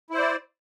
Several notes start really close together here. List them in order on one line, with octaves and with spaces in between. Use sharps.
E4 C5 D5